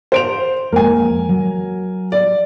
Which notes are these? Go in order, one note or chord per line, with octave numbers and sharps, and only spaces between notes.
C5 D7 F7
F2 G#3 A#3 A#4 G#5
F#3
D5